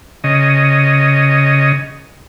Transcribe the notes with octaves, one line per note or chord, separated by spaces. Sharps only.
C#3 D#5